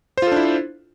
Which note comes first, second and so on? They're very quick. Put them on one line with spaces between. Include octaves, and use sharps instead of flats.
C5 F4 A4 D4 E4